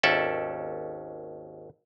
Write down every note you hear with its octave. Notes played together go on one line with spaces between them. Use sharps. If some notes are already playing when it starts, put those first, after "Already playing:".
G#1 D#2 C#4 A4 D5 E5